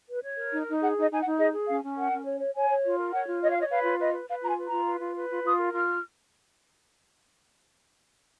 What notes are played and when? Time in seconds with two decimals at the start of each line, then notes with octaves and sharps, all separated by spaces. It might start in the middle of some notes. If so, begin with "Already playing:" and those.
0.09 B4
0.23 C#5
0.38 A#4
0.51 D#4
0.66 D#4
0.81 G#4 F#5
0.96 D#4 D#5
1.10 D#4 G#5
1.20 F#5
1.25 D#4
1.38 G#4 D#5
1.53 G#4
1.68 C#4 F5
1.83 C#4
1.96 A#4 F#5
2.11 C#4
2.25 C#5
2.40 C#5
2.54 C#5 G#5
2.69 C#5
2.84 F4
2.98 A#4
3.12 C#5 F#5
3.27 F4
3.42 C#5 D#5
3.50 F5
3.56 C#5 D#5
3.70 B4 F5
3.85 F4
4.00 B4 D#5
4.14 B4
4.28 B4 F5
4.42 F4 A#5
4.48 G#5
4.58 B4
4.66 A#5
4.71 F4
4.86 B4
5.01 F4
5.16 B4
5.29 F4
5.44 F4 D#6
5.58 A#4
5.72 F4 F6